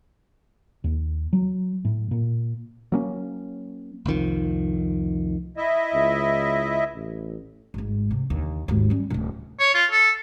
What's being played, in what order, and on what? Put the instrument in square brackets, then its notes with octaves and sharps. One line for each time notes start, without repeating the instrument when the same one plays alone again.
[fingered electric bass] D#2
F#3
A2
A#2
[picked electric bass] F#3 A#3 C#4
[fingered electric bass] F1 C2 D#3 F3
[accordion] E4 D#5 E5
[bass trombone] C#2
A1
[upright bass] G#1 G#2
C3
D#2 D3
G#1 D#2
G3 C#4
D1 F#2
[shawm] C#5
F4
A4